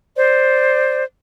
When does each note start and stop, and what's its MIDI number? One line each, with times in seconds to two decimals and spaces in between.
0.15 1.02 72
0.15 1.02 74